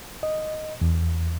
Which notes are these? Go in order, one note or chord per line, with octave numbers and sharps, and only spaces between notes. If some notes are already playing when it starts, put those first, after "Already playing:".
D#5
E2